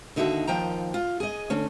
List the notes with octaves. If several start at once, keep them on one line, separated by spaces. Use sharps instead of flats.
D#2 D3 D#4 F#4 A#4 E5
D#2 F3 G5 A#5
F4
G#4 D#5
D3 A3 C#4